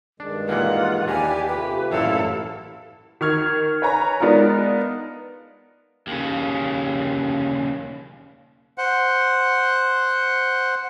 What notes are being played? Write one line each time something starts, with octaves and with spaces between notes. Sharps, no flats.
G2 D#3 G#3 D4
A#2 E3 A#3 F4 F#5
D#2 D4 E4 G4 D5 G#5 A#5
C3 A3 F4 B4
A1 F#2 A#2 E4 A4 F5
D#3 C#6 F6 G#6
B4 C#5 G#5 A#5 B5
G#3 B3 D4 D#4 F4 A#4
D#2 C#3
C5 F#5